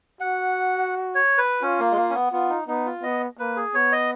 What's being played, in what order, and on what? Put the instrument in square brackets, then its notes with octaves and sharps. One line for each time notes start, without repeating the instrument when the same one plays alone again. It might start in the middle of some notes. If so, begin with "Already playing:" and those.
[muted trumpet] F#4 [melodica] F#5
[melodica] C#5
B4
[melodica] C#4 [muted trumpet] F4
[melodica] A#3
G#3
A#3
C#4
B3
[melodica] B3 [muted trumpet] F4
[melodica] D#4
[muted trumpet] B3 [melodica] D#4
[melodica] F4
[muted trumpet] B3 [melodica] D#5
[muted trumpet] A#3 [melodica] B4
[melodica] G#4
[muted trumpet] B3 [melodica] C#5
[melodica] D#5